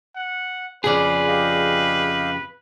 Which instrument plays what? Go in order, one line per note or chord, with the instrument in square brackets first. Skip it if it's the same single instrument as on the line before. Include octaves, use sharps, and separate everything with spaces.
[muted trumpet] F#5
[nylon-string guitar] F2 C#3 F3 [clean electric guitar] G#4 D5 [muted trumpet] B4
[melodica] G4 D#5 F5